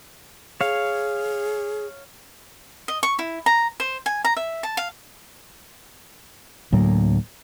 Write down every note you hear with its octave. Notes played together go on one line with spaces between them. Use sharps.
G#4 C#5 F5
D#5
C#6
E4
A#5
C5
G#5
A#5
E5
A5
F5
D2 A2 F#3 A#3